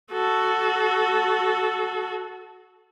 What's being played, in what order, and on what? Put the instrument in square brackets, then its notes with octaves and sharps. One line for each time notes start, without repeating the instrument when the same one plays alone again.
[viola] F#4 A4